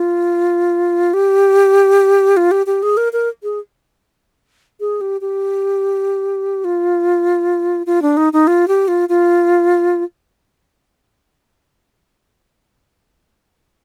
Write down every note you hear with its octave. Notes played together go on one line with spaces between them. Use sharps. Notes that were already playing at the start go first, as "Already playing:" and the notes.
Already playing: F4
G4
F4
G4
G4
G#4
A#4
A#4
G#4
G#4
G4
G4
F4
F4
D4
D#4
D#4
F4
G4
F4
F4